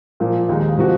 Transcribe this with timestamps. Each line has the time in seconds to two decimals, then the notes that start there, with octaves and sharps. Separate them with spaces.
0.20 A#2 F3 A#3
0.49 D#2 D#3 G#3 D#4
0.77 C3 F3 G#3 C4 F#4